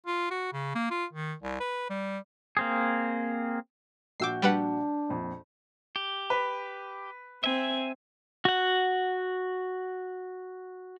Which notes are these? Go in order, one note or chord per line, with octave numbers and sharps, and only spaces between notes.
F4
F#4
C#3
A#3
F4
D#3
C2
B4
G3
A#3 C4 G#4
A#1 F#4 D6 E6 G6 C7
G3 D4 B4 F#5
A#1 F2
G4
B4
C4 E5 G#5
F#4 F#5